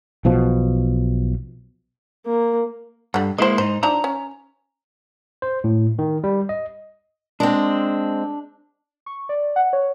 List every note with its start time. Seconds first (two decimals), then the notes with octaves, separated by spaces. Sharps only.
0.25 B1 B2 F3
2.26 A#3
3.14 G2 D3 G3
3.38 G#3 A#3 E4 C5 D#5
3.58 G#2 D#4 C5
3.83 F3 D4 D#4 A#5
4.04 C#4
5.42 C5
5.64 A2
5.99 D#3
6.24 G3
6.49 D#5
7.40 G#3 C4 D4
9.06 C#6
9.29 D5
9.56 F#5
9.73 C#5